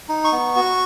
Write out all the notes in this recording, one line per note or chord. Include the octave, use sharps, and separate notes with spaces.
D#4
C#6
B3
F#4